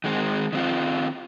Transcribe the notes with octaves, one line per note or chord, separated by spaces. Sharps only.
D#3 G#3 C4
D#3 C4 F4